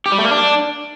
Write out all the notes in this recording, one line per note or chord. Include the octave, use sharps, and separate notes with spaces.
G4
G3
A3
A#3
D4